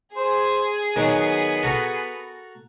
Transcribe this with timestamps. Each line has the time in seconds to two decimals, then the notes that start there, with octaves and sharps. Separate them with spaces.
0.16 G#4 C5
0.96 D#3 F#3 B3
1.63 F#4 A4 A#4